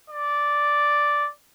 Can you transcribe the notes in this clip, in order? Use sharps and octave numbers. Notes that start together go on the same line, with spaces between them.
D5